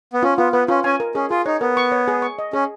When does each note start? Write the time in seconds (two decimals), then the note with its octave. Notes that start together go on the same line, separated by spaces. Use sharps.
0.13 B3
0.23 C#4 F4
0.38 B3 F4
0.53 B3 B4
0.68 C#4 F4
0.84 C#4 G#5
1.00 A#4
1.15 C#4 G#4
1.31 F4 G#4
1.46 D#4 C#5
1.61 B3 A#4
1.77 C#6
1.92 C#5
2.08 G#4
2.22 C#6
2.39 D#5
2.53 C#4 G#4